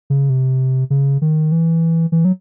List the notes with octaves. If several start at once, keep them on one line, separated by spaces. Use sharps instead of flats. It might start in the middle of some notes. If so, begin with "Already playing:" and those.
C#3
C3
C#3
D#3
E3
E3
F#3